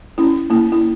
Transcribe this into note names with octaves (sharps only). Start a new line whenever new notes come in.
C#4 E4
A#3 E4
E4